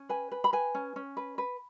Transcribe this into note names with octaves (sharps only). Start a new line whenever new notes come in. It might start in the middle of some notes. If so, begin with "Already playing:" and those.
Already playing: C#4
B4 G#5
B4
B5
B4 G#5
C#4
C#4
B4
B4